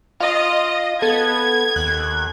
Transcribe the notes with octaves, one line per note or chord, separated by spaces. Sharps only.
F4 D#5 F5
B3 A4 G#6
D#2 F#6